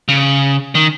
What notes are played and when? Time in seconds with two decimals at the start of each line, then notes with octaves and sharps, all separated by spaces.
0.08 C#3
0.75 D#3